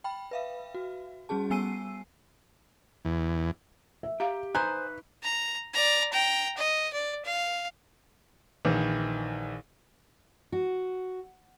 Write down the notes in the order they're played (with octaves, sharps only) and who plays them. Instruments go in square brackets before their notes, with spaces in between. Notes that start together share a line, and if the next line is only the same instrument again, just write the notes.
[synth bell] G5 B5
B4 E5 F5
F#4
G3 C#4 F#4 G#4 A5
G3 B3 G#5 E6 C7 D#7
[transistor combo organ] E2
[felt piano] E5
[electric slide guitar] G4 [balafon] F5 A#5
[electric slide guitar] D#4 B4 [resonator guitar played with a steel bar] C5 G#5 [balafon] A#5 [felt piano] F#6
[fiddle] A#5
D5 A#5
G5 A#5
D#5
D5
F5
[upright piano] A#1 D#3 E3
[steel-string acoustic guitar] F#4